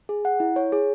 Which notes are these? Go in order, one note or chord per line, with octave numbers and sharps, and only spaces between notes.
G#4
F#5
E4
C#5
G#4